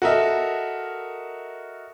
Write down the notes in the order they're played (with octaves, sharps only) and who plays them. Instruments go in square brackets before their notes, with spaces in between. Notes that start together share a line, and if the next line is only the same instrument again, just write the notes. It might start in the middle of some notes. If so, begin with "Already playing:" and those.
[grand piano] F#4 A4 A#4 D#5 E5